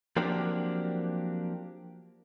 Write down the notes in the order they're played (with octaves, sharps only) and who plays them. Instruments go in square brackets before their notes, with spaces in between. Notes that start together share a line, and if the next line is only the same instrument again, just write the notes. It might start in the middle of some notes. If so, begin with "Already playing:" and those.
[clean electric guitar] F3 F#3 A#3 C4 D4 G4